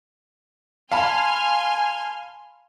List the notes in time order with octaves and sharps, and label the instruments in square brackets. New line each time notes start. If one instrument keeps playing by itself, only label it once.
[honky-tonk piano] F5 A5 B5 [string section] G#5 C6 F6